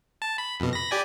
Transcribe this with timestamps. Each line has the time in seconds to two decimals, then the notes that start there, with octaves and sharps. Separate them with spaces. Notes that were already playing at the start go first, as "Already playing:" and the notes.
0.22 A5
0.38 B5
0.60 F2 B2
0.73 B5 A#6
0.91 G4 D5 G#5